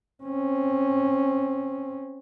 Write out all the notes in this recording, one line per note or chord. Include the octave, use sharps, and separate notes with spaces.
C4 C#4